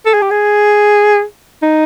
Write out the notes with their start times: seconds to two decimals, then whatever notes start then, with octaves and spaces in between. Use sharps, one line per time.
0.06 A4
0.14 G#4
0.22 G4
0.30 G#4
1.62 D#4